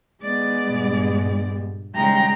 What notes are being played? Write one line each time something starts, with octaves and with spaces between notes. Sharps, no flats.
G#3 B3 D5
G2 A#2 G3
C#3 G3 G#3 G5 A#5